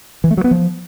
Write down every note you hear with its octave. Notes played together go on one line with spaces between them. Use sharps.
E3
A3
F#3
B3
F3